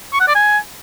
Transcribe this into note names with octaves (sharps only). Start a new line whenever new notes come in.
C#6
F#5
D5
G#5